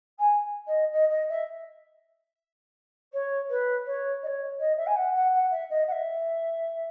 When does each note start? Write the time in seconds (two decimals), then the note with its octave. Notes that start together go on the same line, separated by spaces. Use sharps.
0.19 G#5
0.67 D#5
0.92 D#5
1.10 D#5
1.29 E5
3.13 C#5
3.49 B4
3.85 C#5
4.23 D#5
4.27 C#5
4.60 D#5
4.77 E5
4.86 G#5
4.96 F#5
5.14 F#5
5.33 F#5
5.51 E5
5.70 D#5
5.87 F#5
5.91 E5